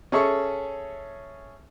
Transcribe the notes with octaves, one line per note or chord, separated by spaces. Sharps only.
C#4 G#4 A4 E5 C#6